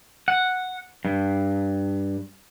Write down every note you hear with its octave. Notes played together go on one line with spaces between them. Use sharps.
F#5
G2